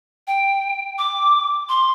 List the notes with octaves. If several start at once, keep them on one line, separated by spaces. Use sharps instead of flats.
G5
D6
C6